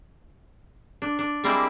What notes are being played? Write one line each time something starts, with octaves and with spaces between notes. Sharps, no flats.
D4
D4
G3 G#3 A#3 C4 E4 G4